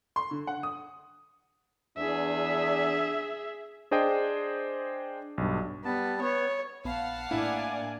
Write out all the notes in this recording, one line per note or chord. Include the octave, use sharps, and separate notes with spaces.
C6
D3
F#5
D#6
E2 D4 G#4 E5
D4 G#4 C5 D5 D#5 G5
B1 G2
G3 B3 A5
B3 C#5
A#1 B3 F5 F#5 A5 B5
A2 A#3 D4 E4 D5 G#5